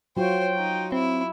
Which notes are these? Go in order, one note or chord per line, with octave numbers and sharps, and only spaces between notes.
F#3 F4 F#4 C5 C#5 G5
D#4
C4 E4